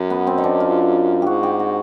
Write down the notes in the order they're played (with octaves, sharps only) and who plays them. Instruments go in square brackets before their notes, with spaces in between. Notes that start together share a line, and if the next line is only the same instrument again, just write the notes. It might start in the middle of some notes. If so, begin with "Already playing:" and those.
Already playing: [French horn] F#2
[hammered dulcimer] B3
C4
D#4
D4
F4
[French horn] G#2 [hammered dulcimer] F#4 G4
[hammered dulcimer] G4
F#4